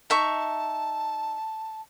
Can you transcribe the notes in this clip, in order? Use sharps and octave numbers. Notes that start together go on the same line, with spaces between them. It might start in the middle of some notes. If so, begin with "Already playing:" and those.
D#4 E5 A5 C#6